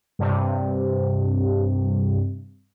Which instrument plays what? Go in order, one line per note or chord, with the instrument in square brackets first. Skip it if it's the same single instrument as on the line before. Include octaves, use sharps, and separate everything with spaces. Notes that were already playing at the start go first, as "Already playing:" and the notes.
[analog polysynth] G2 C3